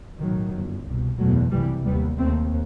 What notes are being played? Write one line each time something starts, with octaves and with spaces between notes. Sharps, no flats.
B1 A2 D#3 F#3
G1 F#2
C2 B2
F#1 E2 B2 F#3 A3
C2 C3 E3 G3
D#2 G3 B3
D#2 A3 C4